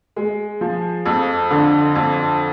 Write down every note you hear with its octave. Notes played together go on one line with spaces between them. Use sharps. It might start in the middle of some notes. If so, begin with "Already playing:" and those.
G#3
F3
F2
D3
F2